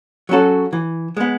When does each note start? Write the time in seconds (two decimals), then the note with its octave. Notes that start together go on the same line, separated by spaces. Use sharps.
0.29 F#3 C#4 F#4 A4
0.73 E3
1.17 G#3 B3